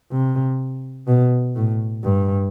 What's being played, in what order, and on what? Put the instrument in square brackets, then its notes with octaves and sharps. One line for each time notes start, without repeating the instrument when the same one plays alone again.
[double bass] C3
B2
A2
G2